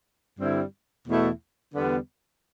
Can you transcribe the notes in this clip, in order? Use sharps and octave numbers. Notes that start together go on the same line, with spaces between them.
G2 D3 G3 C4 E4
E2 B2 A3 E4
E2 D3 G3 B3